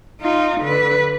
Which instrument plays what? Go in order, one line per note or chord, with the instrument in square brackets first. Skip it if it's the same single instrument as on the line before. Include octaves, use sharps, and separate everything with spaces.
[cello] D#4 F4
D3 B4